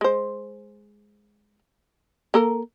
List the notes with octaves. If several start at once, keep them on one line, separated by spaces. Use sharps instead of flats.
G#3 C5
A#3 A4 A#4